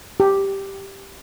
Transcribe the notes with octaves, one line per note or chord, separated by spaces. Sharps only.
G4